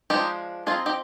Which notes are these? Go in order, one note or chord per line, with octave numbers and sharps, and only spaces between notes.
F3 G#3 D4 D#4 G4
F3 C4 D#4 F4 G#4
D#4 G4